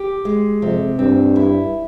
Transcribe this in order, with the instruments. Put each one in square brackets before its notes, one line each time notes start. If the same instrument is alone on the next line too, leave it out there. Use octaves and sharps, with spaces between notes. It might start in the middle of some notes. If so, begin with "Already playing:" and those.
Already playing: [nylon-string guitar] G4
G#3
[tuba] F2 [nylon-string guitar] C3
[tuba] G2 [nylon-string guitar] C4
[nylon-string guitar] E4